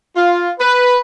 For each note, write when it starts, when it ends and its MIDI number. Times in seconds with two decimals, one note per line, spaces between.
0.17 0.51 65
0.60 0.98 71